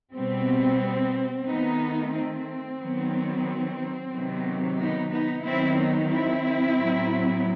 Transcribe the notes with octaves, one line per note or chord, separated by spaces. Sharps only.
B2 G3 B3 C4
D#3 A3 B3 D#4
C4
D#3 F#3 B3
C3 D#3 F#3 B3
B3 D#4
B3 D#4
D#3 F#3 B3 C4 E4
B3 D#4
C4 E4
A2 F#3 B3